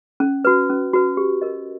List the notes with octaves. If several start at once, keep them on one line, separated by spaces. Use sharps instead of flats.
C#4
F#4 B4
C#4
F#4 B4
G4
A#4 D#5